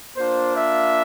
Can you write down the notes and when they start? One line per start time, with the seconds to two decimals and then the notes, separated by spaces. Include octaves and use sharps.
0.17 A#3 D4 F4 C5
0.56 E5